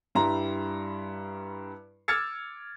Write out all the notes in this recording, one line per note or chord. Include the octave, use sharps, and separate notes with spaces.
G2 G3 E4 A#5 C6
D6 E6 F6 G#6 A6 C#7